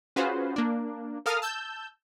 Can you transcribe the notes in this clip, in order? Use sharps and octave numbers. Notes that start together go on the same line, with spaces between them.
C#4 F4 F#4 G#4 B4 C5
A#3 D4
A4 A#4 F5 D#6 F6
A5 E6 G6